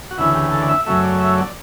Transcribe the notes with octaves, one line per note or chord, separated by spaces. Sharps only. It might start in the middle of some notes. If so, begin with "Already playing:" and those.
F#4
D2 C#3 E3 E4
G4
A4
D5
E5
F#2 C#3 F#3 A3 E5
D5
E5
D5